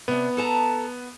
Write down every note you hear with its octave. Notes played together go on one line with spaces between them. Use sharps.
C3 B3 D4
A4 A5 A#5